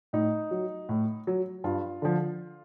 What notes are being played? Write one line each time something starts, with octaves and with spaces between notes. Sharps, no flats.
A2 D#4
F#3
A2
F#3
G2 F4
D3 F3